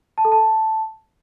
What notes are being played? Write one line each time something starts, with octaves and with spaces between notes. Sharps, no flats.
A5
A4
A5